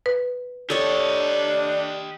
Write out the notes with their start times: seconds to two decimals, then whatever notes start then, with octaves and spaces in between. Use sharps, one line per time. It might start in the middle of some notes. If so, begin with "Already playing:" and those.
0.06 B4
0.70 D4 G4 A4 C#5 D#5